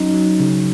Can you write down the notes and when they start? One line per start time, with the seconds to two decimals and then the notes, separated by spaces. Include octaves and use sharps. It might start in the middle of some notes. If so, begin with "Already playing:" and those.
Already playing: F#3 C#4 D#4
0.13 F#3
0.40 C#3